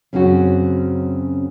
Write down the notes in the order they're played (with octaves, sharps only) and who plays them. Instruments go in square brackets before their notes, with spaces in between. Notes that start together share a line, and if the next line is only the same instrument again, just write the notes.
[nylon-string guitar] F#2 C#3 C4 C#4 F#4